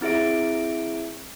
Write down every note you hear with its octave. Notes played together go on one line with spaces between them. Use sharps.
C4 E4 G#4 E5 D7